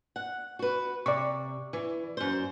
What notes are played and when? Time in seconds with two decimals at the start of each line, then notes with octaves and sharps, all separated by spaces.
0.16 F#5
0.59 F#4 B4
1.06 C3 D5 C#6
1.73 E3
2.17 F#2 C5